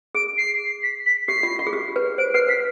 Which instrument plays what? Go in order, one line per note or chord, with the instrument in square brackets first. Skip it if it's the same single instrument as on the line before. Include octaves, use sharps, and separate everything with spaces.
[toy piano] G#4 [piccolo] D7
[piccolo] C7
B6
B6
[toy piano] G4 [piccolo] C7
[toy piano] F4
F4
G#4
G4
B4
[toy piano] C5 [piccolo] D7
[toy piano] B4 [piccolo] C7
[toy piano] B4 [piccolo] B6